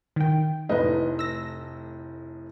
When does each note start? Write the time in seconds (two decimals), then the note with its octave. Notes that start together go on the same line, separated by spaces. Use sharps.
0.16 D#3 G5
0.69 F1 A2 D#4 B4 D#5
1.19 E6 A#6